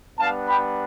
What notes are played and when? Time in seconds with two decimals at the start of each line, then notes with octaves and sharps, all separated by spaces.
0.18 G3 B3 D4 F5 A5
0.47 G5 B5